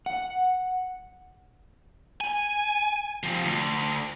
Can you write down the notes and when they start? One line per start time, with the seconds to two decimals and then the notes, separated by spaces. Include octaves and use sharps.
0.06 F#5
2.21 G#5
3.23 C3 F3
3.44 D2